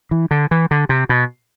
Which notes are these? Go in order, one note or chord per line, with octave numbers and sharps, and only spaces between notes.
E3
D3
E3
D3
C3
B2